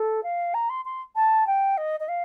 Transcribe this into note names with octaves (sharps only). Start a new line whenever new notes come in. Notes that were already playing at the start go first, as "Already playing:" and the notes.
Already playing: A4
F5
A#5
C6
C6
A5
G5
D#5
D#5
F5